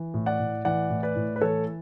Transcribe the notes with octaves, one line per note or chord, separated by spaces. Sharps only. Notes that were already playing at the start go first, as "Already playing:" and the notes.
Already playing: E3
A2
D5 F#5
A2
E3 D5 F#5
A2
B4 D5
A2
B4
E3 A4 C#5